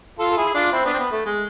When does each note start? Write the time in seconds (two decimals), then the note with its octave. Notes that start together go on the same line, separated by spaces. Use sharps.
0.19 F4 A4
0.31 A4
0.37 E4 G#4
0.54 D4 F4
0.72 C4 E4
0.85 B3 D4
0.93 C4
0.99 B3
1.12 A3
1.26 G#3